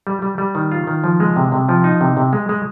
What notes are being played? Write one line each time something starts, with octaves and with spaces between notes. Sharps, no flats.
G3
G3
G3
D#3
F4
D#3
F3
G#3
C3
C3
F3
D#4
C3
C3
G#3
G#3